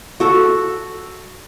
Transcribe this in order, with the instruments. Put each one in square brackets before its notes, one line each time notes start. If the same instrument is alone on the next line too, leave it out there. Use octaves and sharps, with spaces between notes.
[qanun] F#4 A4